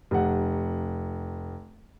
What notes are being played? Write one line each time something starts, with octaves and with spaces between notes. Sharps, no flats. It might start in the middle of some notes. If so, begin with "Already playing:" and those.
F1 F#5